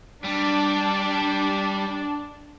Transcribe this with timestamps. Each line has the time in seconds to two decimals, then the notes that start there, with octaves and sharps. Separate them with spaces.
0.24 G3 D4